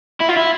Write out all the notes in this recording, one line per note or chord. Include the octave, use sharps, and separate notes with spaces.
E4
F4
E4